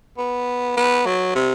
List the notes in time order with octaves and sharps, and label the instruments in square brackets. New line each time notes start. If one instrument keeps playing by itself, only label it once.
[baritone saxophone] B3
B3
F#3
C3